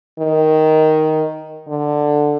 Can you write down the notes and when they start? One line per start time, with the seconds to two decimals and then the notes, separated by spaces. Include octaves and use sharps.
0.19 D#3
1.68 D3